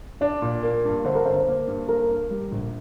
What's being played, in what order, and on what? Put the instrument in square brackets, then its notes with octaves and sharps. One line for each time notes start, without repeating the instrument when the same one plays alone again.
[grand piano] D4 [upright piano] D5
[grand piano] A#2
A#3
G2
[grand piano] D3 [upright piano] C5
[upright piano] A#4
[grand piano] G1 [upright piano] C5
[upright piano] C5
[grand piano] A#3
G2
[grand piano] A#3 [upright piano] A#4
[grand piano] G2
G3
A#1